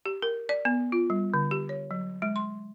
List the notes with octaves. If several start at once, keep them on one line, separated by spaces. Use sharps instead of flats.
G4
A#4
D5
B3
F4
G3
D3
G4
C#5
F#3
G#3
C6